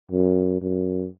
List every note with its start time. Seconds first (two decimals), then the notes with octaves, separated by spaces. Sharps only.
0.11 F#2
0.61 F#2